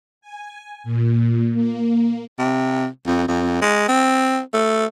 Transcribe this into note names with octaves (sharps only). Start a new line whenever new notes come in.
G#5
A#2
A#3
C3
F2
F2
G#3
C4
A3